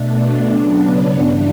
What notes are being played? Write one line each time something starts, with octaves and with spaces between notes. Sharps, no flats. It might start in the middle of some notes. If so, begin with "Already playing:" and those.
Already playing: B2 A3 D4
C#3 F#3 B3 D4
G2 E3 G3 D4